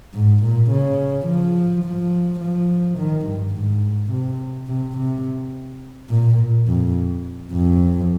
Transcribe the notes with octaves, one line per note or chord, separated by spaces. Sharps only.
G#2
A#2
C#3
F3
F3
F3
D#3
G2
G#2
C3
C3
C3
A#2
F2
F2